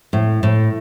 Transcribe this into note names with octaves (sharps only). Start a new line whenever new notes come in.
A2
A2